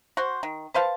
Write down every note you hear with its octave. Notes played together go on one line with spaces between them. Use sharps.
F#4 C5
D#3
B4 C5 F5 A5